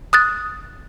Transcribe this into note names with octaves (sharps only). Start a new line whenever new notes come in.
D#6 F#6 A6